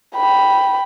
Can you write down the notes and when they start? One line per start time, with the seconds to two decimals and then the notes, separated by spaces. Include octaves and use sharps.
0.16 G5 B5